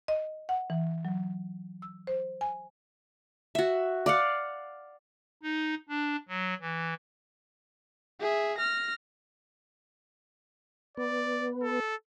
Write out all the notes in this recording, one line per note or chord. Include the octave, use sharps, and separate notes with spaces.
D#5
F#5
E3
F#3
E6
C5
G#5
F#4 E5
D5 F5 F#5
D#4
D4
F#3
E3
G#4 E5
F6 A#6
B3 D5
A4